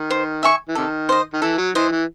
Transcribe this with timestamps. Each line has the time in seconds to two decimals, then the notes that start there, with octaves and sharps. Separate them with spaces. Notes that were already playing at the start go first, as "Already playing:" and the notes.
Already playing: D#3
0.10 C5
0.43 E5 G#5 C#6
0.68 E3
0.75 C3 D#3 A4
1.09 C5 D#5
1.33 D#3
1.42 E3 A4
1.58 F#3
1.75 E3 C5 D#5
1.92 E3